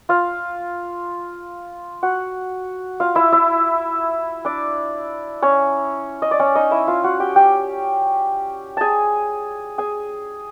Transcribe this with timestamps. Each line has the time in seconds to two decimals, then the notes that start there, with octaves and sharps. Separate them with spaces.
0.09 F4 F5
2.03 F#4 F#5
3.00 F4 F5
3.15 E4 E5
3.32 E4 E5
4.45 D4 D5
5.42 C#4 C#5
6.22 D#5
6.31 D5
6.39 C#4 C#5
6.55 D#4 D#5
6.71 E4 E5
6.87 F4 F5
7.04 F#4 F#5
7.20 G4 G5
7.36 G4 G5
8.77 G#4 G#5 A5
9.78 G#4 G#5